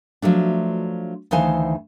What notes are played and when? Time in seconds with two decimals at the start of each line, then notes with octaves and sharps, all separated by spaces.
0.22 F3 F#3 A3 D4
1.31 D2 D#3 E3 C5 F5 G#5